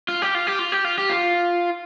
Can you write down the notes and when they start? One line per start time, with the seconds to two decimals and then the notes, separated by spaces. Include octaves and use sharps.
0.08 F4
0.22 G4
0.34 F4
0.47 G4
0.59 F4
0.72 G4
0.85 F4
0.98 G4
1.10 F4